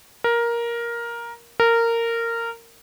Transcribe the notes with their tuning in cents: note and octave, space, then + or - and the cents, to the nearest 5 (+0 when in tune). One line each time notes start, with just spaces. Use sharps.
A#4 +10
A#4 -15